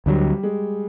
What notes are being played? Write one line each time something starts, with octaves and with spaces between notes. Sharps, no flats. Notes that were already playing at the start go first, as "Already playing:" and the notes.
D2 D3 F#3 G3
G#3